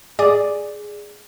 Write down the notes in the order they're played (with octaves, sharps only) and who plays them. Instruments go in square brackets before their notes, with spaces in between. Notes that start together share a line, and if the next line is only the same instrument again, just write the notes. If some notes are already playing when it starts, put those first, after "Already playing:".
[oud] G#4 [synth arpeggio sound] D5